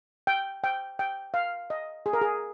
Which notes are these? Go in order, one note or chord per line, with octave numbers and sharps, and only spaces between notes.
G5
G5
G5
F5
D#5
G#4
A#4
G#4